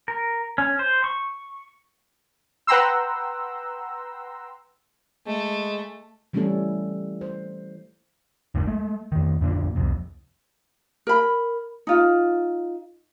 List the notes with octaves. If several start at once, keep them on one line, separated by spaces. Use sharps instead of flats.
A#4
C#4
C5
C#6
B4 F#5 G5 A#5 C6 E6
G#3 A3
E3 G3 A3 C#4 E4 A4
C5
F#1 D#2 G#2 D#3
G#3 A3
F2 D#3
F2 A2 D3 A#3
C2 F2 C3
A#4 B5
D#4 F4